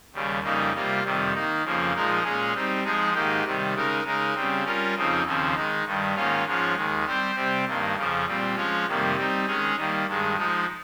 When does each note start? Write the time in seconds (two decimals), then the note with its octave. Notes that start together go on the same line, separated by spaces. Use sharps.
0.13 D#2 C#3 G3
0.43 F2 C#3 G3 A#3 D#4
0.73 C3 G3 A#3 F4
1.03 F2 C3 D#3 G3
1.33 D#3 A#3 D#4
1.64 F2 C#3 F3 A#3
1.94 A#2 F3 G#3 D#4 A#4
2.23 A#2 G#3 C#4 G#4
2.54 G3 C4 D#4
2.84 F3 G#3 D#4 G#4
3.14 G#2 D#3 A#3 D#4 G4
3.44 C3 D#3 G3
3.74 C#3 G#3 D#4 A#4
4.04 C#3 G#3 D#4 A#4
4.34 C#3 G3 C4
4.65 G3 C#4 F4 A#4
4.94 F2 C#3 F3 C4 D#4
5.25 D#2 C#3 F3 C4
5.55 D#3 G#3 D#4
5.84 G2 D#3 G3
6.14 G#2 D#3 A#3 C#4 F4
6.45 G#2 F3 G#3 C#4 F4
6.75 D#2 D#3 G#3
7.05 G3 C4 G4 C5
7.35 C3 G3 C4 G4
7.65 G2 D#3 A#3
7.95 F2 C#3 F3
8.26 A#2 G3 C4
8.55 F3 G#3 C#4 F4
8.86 F2 C3 D#3 G3 A#3
9.15 G3 C4 D#4
9.46 D#3 G#3 C#4 G#4
9.76 D#3 G3 A#3
10.06 G2 D#3 G#3
10.36 F3 G#3 D#4